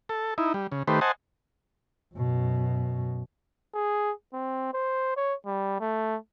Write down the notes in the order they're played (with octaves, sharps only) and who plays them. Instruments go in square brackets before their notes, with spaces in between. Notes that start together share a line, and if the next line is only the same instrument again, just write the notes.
[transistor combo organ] A4
D#4 E4
G3
C#3
D#3 A3 G4 B4 C5
C5 D#5 F#5 G#5 A5
[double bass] F#2 B2
[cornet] G#4
C4
C5
C#5
G3
A3